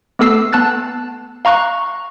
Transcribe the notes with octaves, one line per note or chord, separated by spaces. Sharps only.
A3 B3 A4 E6 C7
B3 A5 F#6 A6
F5 A#5 C#6 F#6